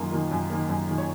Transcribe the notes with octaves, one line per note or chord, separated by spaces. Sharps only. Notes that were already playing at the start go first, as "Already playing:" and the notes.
Already playing: F#2 D#3 A#3 F4
D#3 A#3
F#2
D#3 A#3
F#2
D#3 A#3
C#5